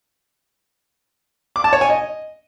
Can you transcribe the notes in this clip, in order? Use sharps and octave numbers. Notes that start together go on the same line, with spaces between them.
D6
A5
C#5
G#5
D#5